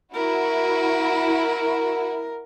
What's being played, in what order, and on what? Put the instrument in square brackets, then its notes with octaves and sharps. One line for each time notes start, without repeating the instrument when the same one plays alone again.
[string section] E4 F#4 [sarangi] A#4